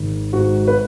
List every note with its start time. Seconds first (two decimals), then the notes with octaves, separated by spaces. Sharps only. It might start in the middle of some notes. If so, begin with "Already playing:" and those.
Already playing: G#1
0.33 G#2 F#4
0.68 B4